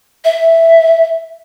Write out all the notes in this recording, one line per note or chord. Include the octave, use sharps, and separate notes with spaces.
E5